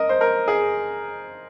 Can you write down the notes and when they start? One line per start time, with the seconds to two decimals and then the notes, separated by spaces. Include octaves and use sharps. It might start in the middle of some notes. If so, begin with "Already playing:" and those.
Already playing: A#4 D#5
0.09 C5
0.21 A#4
0.48 G#4